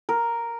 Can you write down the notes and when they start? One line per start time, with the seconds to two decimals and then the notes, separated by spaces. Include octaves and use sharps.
0.09 A#4